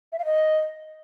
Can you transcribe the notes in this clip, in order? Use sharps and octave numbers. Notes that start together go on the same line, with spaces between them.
E5
F5
D#5